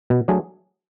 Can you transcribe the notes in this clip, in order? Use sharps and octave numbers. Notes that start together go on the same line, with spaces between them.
B2
F#3 A3 D4 G#4